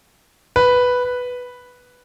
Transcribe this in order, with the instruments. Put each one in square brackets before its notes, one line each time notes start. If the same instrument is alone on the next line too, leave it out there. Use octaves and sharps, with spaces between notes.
[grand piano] B4